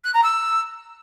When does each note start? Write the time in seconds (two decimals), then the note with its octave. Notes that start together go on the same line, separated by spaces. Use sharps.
0.04 F#6
0.13 A#5
0.23 E6